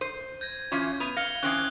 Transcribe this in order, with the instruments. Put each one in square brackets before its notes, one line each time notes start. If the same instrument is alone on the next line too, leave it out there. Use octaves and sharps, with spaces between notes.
[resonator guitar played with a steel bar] C5 [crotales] D#7
[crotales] G6 G#6 A#6
[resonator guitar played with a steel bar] E3 C#4 F4
[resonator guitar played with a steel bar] B3 [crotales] D#7 F7
[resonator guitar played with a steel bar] F5 [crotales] A#6 C#7 G7
[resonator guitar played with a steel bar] E3 C4 C#4 [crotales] D#6 F#6